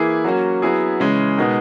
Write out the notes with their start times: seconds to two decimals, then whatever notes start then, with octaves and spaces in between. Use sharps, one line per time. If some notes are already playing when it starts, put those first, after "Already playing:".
Already playing: E3 A#3 E4 G#4
0.25 F#3 A#3 C#4 F#4
0.62 F#3 B3 E4 G#4
1.00 C#3 E3 G#3 C#4
1.37 B2 G#3 B3 D#4 A#4